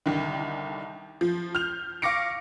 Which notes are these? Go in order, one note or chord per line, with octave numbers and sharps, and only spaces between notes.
C2 D3 D#3
F3
F6 G6 F7
F5 C#6 D6 A#6 C#7 D7